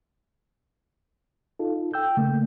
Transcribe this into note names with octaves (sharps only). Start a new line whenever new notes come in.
D#4 F4 A4
G5 E6 G6
C#3 A3 A#3